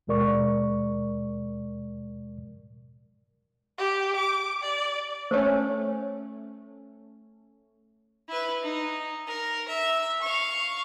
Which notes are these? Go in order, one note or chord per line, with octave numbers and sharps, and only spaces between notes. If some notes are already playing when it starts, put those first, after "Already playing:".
D#2 B2 G#3 A#4 D5 C#6
G4
D6
D5
A3 C#4 C5 C#5
E4 B4
D#4
A#4
E5
F5 C#6